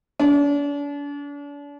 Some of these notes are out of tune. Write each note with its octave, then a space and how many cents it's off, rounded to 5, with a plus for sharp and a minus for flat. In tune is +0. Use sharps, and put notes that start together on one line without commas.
D4 -40